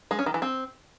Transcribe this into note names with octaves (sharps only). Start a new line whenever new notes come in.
G#3
C#4
D#3
E3
C4